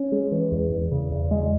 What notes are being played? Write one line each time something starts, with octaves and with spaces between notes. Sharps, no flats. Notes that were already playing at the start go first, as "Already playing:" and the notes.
Already playing: C#4
G#3
E3
E2
E2
C#3
E2
G#3